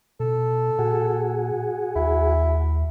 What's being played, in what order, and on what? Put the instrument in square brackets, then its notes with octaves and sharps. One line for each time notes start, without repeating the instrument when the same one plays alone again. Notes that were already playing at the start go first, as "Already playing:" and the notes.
[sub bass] B2 [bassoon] A4
[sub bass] A#2 [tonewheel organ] F#4 G#4
[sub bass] D#2 [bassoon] E4